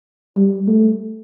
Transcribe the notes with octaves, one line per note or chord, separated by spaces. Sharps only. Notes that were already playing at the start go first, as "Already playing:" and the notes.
G3
A3